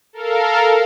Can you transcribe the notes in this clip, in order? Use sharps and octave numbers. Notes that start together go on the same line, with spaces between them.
A4 A#4 F5